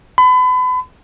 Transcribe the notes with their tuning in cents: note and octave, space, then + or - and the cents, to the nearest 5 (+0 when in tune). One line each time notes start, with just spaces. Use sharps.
B5 +35